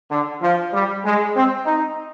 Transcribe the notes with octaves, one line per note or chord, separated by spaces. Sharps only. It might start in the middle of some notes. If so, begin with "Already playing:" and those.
D3
F3
G3
G#3
C4
D#4